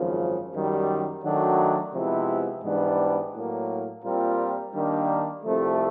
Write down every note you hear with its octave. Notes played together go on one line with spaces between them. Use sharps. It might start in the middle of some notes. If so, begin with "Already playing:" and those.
Already playing: G#1 F#2 C#3 F3
F#2 D#3 G3
D#3 F#3 A3 D4 F#4
C3 F3 G#3 B3 E4
G#2 E3 G3 B3 D4
A2 F#3 A#3
A#2 G3 C4 F4 A#4
D#3 G3 A#3 D4
C2 C3 F3 A3